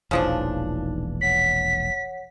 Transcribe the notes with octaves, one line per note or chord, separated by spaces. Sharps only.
E1 A#1 C#3 E3 F3 D4 D#4
C#5 F#5 B6